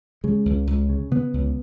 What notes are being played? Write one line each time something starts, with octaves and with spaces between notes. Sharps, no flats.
C#3 G#3
C#2
C#2
C#3
C#3 B3
C#2